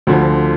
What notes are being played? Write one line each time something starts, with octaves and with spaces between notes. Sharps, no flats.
D2 D3 F3